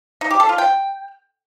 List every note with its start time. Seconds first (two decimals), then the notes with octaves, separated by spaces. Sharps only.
0.21 D#4
0.30 G4
0.40 A4
0.49 F4
0.58 G5